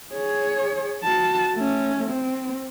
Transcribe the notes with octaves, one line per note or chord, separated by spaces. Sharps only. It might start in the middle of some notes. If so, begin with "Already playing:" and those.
G#4 C#5
F#4 A5
A3 C#4
C4